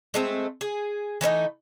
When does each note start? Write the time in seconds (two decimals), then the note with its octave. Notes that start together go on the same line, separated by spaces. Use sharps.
0.14 G#3 A3 C4
0.61 G#4
1.21 E3 A3 C#4 D#4